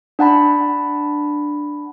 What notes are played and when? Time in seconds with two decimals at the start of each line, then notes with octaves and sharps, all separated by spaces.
0.19 D4 F#5 A5 B5